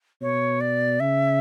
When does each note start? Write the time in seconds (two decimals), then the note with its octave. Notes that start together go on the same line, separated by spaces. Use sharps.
0.21 B2 C#5
0.61 D5
1.00 C#3 E5